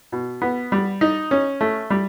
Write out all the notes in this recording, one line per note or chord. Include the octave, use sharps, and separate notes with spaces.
B2
B3
G3
D#4
C#4
A3
G3